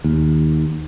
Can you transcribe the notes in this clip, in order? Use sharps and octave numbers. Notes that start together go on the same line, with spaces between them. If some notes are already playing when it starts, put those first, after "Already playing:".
D#2